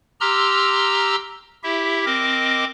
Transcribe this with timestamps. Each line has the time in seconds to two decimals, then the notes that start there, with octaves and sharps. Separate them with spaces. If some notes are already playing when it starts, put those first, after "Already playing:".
0.21 G4 A#5 C6 E6 F6
1.63 E4 G4 E5
2.06 C4 A#4 D#5 D6